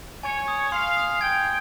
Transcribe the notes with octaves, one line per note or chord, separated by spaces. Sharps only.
C#5 G#5
D#6
F5 C6
D#6
G5 G#6